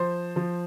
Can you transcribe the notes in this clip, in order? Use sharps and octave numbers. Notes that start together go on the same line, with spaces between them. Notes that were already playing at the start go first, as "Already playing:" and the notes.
Already playing: F3 C5
F3